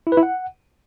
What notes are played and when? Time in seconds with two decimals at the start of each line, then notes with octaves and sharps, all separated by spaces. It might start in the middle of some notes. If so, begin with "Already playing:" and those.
0.07 E4
0.12 B4
0.17 E4
0.23 F#5